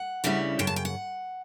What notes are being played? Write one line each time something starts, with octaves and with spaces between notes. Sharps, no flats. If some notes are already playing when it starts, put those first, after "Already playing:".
Already playing: F#5
D2 C#3 G3 C#4 E4
F#2 C#3 G5
A5
G5
F#5